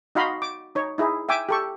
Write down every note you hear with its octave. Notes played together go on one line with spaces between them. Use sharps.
D#4 F#4 D#5 F5 B5 C6
D6
D#4 C#5
D#4 E4 G#4
E5 G5 G#5 D6
G4 A4 C#6